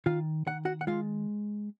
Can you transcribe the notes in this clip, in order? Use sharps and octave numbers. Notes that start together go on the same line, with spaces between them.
D#3 F4 F5
D#3 F#5
F#4 F#5
F#5
G#3 F4 F5